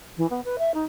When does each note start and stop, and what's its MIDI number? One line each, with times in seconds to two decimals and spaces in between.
0.17 0.26 52
0.30 0.41 59
0.45 0.56 71
0.58 0.72 76
0.74 0.85 63